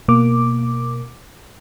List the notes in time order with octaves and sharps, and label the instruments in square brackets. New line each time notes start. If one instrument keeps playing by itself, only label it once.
[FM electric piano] B2 A#3 D6